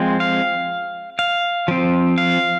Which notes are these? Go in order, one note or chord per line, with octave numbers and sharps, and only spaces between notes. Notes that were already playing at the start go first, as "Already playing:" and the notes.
Already playing: F3 G#3 C4
F5
F5
F3 C4
F5